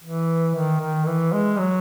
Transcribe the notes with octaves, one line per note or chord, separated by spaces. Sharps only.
E3
D#3
D#3
E3
G#3
F#3